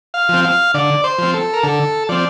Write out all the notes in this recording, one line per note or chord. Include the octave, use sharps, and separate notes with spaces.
F5
F3 C4
F5
D3 D5
C5
F3 C4
A4
A#4
D3 A4
F3 C4 D5